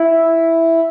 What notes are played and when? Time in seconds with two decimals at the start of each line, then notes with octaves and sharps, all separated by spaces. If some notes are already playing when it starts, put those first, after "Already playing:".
Already playing: E4